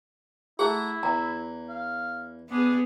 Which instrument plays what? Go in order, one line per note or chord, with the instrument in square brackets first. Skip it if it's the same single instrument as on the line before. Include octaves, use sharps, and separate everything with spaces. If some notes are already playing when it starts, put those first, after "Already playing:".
[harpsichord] A3 F#5 A#5 [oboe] E4 [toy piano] G#4
[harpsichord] E2 [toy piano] A#5
[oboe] F5
[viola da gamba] B3 G#4 [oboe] D4